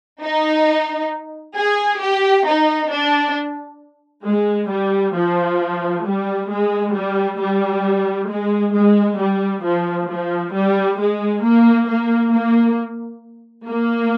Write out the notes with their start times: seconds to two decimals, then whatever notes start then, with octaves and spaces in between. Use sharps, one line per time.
0.22 D#4
1.57 G#4
2.02 G4
2.47 D#4
2.92 D4
4.26 G#3
4.71 G3
5.16 F3
6.06 G3
6.50 G#3
6.95 G3
7.39 G3
8.29 G#3
8.74 G#3
9.19 G3
9.64 F3
10.09 F3
10.53 G3
10.99 G#3
11.44 A#3
11.88 A#3
12.33 A#3
13.68 A#3